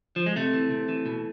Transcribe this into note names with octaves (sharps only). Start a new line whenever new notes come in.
F3
G#3
C3 A3
E3
C3
E3
B2